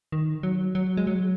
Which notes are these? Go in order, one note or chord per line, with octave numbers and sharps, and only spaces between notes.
D#3
F#3
F#3
G#3
F#3